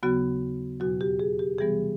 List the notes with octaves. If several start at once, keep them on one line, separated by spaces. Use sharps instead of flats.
D#2 C#3 F#3 B3 F#4
E2 B2 F#3 F#4
G4
G#4
G4
C3 E3 G3 B3 G#4